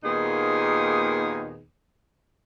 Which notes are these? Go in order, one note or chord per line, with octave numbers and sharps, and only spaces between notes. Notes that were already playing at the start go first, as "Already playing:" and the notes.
D#2 A#2 B3 D#4 G#4